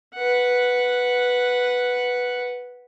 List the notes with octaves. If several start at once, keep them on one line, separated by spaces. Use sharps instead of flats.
B4 F#5